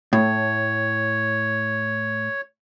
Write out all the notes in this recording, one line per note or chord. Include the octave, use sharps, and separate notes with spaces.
A2 C#5